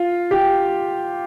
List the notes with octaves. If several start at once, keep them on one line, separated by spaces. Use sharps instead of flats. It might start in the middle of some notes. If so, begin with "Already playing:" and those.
Already playing: F4
G4